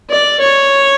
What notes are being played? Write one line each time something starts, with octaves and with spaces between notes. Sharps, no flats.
D5
C#5